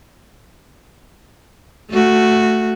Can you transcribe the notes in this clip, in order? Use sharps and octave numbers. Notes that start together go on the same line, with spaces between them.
A3 F#4